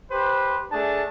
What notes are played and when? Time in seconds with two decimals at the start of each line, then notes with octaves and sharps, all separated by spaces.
0.11 G4 B4 C5
0.72 A3 D4 G#4 A5